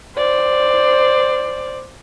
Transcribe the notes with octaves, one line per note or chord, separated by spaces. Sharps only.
C5 D5